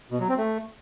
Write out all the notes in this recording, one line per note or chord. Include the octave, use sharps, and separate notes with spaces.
B2
F#3
C4
A3